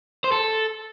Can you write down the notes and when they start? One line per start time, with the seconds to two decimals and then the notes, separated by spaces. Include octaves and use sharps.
0.24 C5
0.32 A4